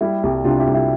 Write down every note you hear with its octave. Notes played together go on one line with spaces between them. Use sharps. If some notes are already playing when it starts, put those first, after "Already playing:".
G3 E4 G4
C2
C3 D4 F4
E4 G4
C2
E4 G4